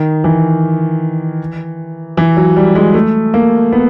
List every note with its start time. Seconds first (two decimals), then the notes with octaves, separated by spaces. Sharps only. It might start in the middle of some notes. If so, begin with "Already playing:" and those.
Already playing: D#3
0.24 E3
2.17 E3
2.37 F#3
2.57 G3
2.75 G#3
2.94 A3
3.34 A#3
3.73 B3